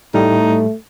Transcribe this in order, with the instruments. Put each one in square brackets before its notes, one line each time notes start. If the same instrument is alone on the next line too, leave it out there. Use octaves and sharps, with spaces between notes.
[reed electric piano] A2 G3 [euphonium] A3 [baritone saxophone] D#4